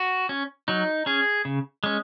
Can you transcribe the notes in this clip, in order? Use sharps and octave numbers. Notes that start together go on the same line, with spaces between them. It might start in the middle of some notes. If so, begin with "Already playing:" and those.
Already playing: F#4
C#4
F#3 D#4
C#4 G#4
C#3
G#3 C#4